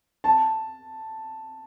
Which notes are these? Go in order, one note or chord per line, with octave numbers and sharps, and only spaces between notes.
A5